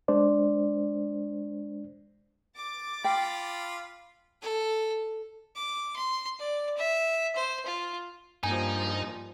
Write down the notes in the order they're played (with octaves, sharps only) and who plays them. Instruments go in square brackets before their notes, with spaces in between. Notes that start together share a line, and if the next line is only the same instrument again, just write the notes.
[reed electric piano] G#3 D4 C5 D5
[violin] D6 A6
[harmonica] F4 F5 B5 [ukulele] G5
[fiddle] A4
D6
C6
D5
E5
C5
F4
[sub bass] G2 [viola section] F3 G3 A#3 [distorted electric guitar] D#4 [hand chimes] G#5